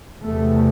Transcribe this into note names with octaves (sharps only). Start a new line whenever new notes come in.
E2 C3 A3